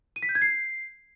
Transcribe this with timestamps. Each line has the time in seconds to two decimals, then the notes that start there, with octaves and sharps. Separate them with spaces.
0.16 D#7
0.22 B6
0.29 G6
0.35 G#6
0.42 C7